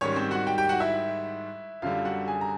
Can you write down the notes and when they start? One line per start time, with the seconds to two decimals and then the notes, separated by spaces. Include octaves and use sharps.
0.01 G#2 D#3 G3 C#4 C#5
0.16 C4 C5
0.31 F#4 F#5
0.47 G4 G5
0.58 G4 G5
0.69 F#4 F#5
0.80 E4 E5
1.82 F#2 D3 G3 F4 F5
2.05 F#4 F#5
2.28 G#4 G#5
2.41 A#5